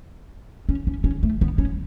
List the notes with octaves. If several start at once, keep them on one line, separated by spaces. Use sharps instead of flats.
C#4
C#4
C#4
A3
B3
C#4